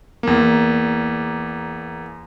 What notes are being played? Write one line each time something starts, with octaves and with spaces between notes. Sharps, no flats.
E2 A#3